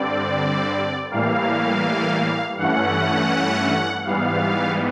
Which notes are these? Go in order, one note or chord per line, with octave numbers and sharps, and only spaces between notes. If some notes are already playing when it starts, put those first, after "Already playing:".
Already playing: G2 D3 G3 C4 D5
A2 E3 G3 A#3 F5
G2 E3 A3 C#4 F#5
G#2 E3 G3 B3 F5